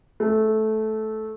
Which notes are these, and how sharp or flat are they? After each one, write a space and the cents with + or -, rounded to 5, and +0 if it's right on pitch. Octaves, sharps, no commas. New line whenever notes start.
A3 -15